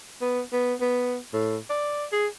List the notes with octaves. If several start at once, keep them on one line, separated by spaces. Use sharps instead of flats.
B3
B3
B3
A2
D5
G#4